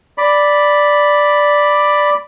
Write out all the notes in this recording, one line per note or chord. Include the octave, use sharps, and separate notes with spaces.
D5 B5